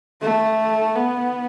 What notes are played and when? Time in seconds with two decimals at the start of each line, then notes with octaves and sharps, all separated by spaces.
0.22 A3
0.95 B3